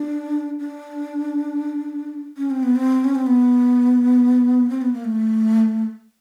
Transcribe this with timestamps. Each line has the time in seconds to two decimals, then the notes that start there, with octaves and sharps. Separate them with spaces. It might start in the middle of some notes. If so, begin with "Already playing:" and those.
Already playing: D4
0.59 D4
2.37 C#4
2.50 C4
2.63 B3
2.75 C4
3.04 C#4
3.15 C4
3.27 B3
4.70 C4
4.81 B3
4.93 A#3
5.04 A3